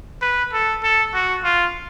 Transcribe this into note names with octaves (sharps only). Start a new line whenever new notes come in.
B4
A4
A4
F#4
F4